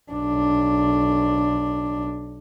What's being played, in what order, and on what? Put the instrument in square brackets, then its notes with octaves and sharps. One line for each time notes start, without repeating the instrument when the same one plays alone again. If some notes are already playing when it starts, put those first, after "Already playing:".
[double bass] B1 D4